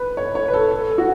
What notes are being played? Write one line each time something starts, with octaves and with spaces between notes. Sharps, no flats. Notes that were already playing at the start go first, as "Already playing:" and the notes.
Already playing: B4
C#5
C#5
B4
A4
A4
F#4